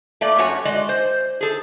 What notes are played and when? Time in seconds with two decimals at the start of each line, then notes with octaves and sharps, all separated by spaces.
0.21 A3 A#3 D5
0.39 F#2 F#4 C#5 G#5
0.65 G#3 D5 D#5
0.89 C5
1.41 G#4 A4